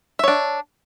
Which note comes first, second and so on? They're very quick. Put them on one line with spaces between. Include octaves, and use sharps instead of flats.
E5 C#5 D4